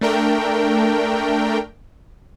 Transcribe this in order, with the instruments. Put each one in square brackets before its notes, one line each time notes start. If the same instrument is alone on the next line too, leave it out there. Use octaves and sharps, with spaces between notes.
[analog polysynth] A3 D4 A#4 G5